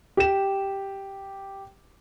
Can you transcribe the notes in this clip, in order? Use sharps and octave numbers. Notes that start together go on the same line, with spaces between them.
G4 E7